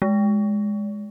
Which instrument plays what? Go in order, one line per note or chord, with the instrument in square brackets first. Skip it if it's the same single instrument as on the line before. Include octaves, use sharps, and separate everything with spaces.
[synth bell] G#3